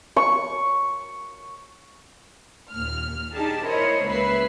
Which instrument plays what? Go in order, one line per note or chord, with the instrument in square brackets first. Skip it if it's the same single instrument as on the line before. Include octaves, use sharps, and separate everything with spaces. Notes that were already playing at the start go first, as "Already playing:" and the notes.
[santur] C#6
[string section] D#2 A#2 F6
D4 D#4 G4 G#4 A5
E4 A#4 C5 C#5 D#5
C#2 F#2 A#3 B4 E5 C7